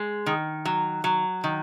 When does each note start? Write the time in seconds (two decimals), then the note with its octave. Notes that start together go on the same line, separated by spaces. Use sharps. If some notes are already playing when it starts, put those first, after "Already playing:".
Already playing: G#3
0.26 D#3
0.65 F#3
1.04 F#3
1.44 D#3